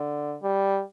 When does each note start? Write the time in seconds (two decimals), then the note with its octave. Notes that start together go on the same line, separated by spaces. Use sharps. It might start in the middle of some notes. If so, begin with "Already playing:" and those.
Already playing: D3
0.43 G3